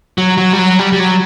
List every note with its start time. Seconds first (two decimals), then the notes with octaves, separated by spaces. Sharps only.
0.18 F#3
0.38 F#3
0.53 G3
0.59 F#3
0.79 G3
0.92 G3
1.00 F#3